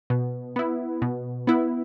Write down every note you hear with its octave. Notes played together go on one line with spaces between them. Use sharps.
B2
B3 E4
B2
B3 E4